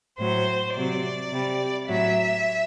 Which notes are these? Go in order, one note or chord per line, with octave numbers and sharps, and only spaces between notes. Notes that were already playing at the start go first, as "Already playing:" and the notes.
A2 F#3 C5
C3 F#3 D5
C3 G3
A2 F#3 E5